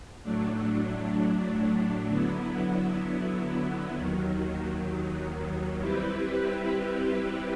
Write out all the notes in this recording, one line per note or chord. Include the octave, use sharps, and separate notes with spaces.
A2 F#3 A3 D4
D3 F#3 B3 E4
D#2 D#3 F#3
G3 C4 E4 G4 B4